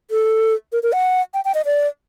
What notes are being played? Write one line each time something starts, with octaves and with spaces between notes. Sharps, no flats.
A4
A#4
A#4
F#5
G5
G5
D#5
D5